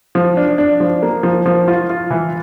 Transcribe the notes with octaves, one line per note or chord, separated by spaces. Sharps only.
F3
D4
D4
F3
A#3
F3
F3
F4
F4
E3